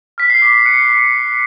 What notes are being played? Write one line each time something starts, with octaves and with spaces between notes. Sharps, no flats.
F6 B6
C7
D6
F#6 C#7